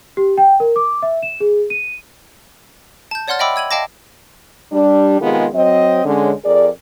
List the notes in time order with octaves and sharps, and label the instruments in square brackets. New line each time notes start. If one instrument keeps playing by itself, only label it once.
[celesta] G4
G5
A#4
D6
E5
E7
G#4
D#7
[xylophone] A5 G6
C#5 D5 F#5 C6 F6 A6
D#5 E5 G5 B5 D6 E6
E6 G#6 D#7 F#7
D#5 F5 G5 A5 D6 A#6
[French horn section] G3 D4
C3 D#3 G#3 B3 F4 G#4
F#3 C4 D#5
D3 G#3 C#4
F2 G#4 A#4 D5